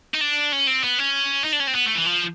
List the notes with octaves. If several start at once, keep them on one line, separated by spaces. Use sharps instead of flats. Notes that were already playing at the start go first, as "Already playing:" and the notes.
D#4
D4
C#4
C4
B3
C#4
D#4
D4
C#4
C4
B3
A3
E3
F3